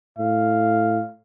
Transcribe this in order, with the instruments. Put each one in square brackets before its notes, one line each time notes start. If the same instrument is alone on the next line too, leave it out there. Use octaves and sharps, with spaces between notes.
[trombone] A2 [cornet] F5